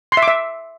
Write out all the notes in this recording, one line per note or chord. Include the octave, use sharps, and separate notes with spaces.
C6
E5
D6
E5